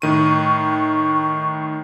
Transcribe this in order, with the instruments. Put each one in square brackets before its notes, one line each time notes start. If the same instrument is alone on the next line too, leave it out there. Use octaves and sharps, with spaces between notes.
[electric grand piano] A2 D#3 D#7 [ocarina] C#6